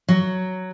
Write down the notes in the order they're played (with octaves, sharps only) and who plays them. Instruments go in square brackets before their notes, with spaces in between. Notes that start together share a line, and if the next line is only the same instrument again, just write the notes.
[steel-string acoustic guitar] F#3